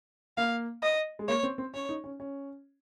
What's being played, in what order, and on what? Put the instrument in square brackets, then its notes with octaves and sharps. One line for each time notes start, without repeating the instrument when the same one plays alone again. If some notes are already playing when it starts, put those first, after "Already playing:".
[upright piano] A#3 [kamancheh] F5
[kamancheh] D#5
[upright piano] G#3
[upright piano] A#3 [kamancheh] C#5
[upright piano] C4
C4
[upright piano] C#4 [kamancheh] C#5
[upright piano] D#4
C#4
C#4